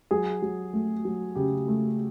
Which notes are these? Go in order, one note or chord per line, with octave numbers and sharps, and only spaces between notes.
F#3 G#4
F#3
A3
F#3
C#3 G4
A3